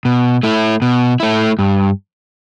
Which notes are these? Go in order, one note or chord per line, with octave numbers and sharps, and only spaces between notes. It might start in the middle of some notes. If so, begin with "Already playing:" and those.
B2
A3 E4
B2
A3 E4
G2